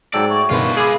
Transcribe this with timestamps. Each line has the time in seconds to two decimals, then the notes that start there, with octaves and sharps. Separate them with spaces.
0.14 G#2 F#3 A4 D5 G5 E6
0.30 A3 F#4 C#5
0.51 G1 B2 D#3 F4 B4
0.77 G#4 B5 D6 E6